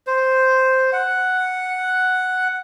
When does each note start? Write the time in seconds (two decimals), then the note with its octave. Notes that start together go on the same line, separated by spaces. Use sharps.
0.07 C5
0.93 F#5